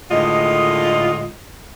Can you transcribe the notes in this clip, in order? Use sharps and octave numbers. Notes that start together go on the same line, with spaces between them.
A2 D3 D#3 G#3 F4 D#5